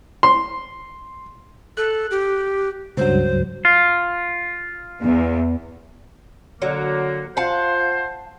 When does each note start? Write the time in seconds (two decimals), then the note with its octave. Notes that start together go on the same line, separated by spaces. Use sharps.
0.23 C6
1.77 A4 F#6
2.11 G4
2.97 C#2 G2 F#3 C5
3.65 F4
5.01 E2
6.62 D3 F#3 A#3
7.37 F4 C5 F5 F#5 A5